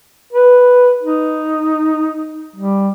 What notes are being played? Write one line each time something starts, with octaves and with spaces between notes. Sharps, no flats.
B4
D#4
G3